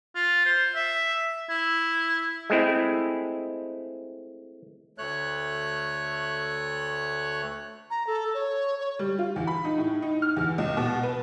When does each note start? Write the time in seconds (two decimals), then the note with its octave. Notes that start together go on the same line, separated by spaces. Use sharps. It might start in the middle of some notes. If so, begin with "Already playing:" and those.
0.15 F4
0.45 C5
0.75 E5
1.49 E4
2.50 G#3 A3 C4 E4
4.98 D2 A3 C#5 F#6
7.90 A#5
8.07 A4
8.34 C#5
8.80 C#5
8.99 G3
9.18 F4
9.36 E2
9.47 B5
9.65 D#4
9.78 A2
10.02 D#4
10.22 F6
10.37 E2
10.58 C#2
10.77 B2
11.03 B4